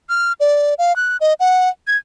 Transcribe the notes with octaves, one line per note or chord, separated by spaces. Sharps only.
F6
D5
F5
F#6
D#5
F#5
G#6